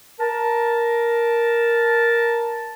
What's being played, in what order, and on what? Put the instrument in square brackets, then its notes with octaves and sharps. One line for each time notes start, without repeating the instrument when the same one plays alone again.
[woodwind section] A#4 A5